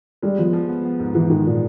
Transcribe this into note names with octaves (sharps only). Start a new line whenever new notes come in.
G3 G#3
F3 B3
F3
B3
B3
G#2
G#2 E3
D#3 G#3
A#2